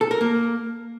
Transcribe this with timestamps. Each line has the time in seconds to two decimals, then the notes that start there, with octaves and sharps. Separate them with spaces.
0.01 A4
0.11 A#4
0.21 A#3